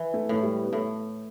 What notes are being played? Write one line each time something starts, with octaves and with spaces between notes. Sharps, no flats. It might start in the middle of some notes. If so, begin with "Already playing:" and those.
Already playing: E3
A3
A2 A3
G3
B3
A2 A3